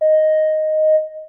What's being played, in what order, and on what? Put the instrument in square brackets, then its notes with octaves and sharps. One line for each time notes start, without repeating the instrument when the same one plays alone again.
[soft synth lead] D#5